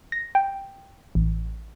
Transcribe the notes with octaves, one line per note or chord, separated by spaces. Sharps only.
A#6
G5
A1